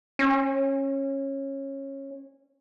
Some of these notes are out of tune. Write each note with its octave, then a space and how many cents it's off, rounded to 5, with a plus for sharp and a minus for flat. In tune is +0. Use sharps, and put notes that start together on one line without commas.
C#4 -20